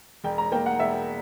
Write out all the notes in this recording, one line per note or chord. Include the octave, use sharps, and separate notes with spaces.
E1 G5
A#5
A#3 G5
F#5
E1 E5